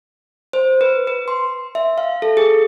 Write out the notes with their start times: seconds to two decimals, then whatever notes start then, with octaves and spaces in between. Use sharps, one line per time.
0.53 C5
0.81 B4
1.07 B4
1.28 C6
1.75 E5
1.98 F5
2.22 A4
2.37 G#4